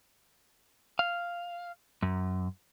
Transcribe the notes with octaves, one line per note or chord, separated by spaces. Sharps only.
F5
F#2